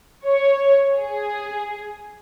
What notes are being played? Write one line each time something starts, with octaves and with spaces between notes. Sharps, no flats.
C#5
G#4